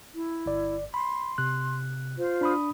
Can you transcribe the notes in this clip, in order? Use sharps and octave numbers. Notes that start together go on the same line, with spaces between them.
E4
G1 D5
B5 C6
C3 F#6
F4 C5
D4 B5 D#6